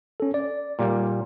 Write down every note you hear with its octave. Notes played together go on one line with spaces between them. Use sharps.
C#4 A4
D5
A#2 G3 F5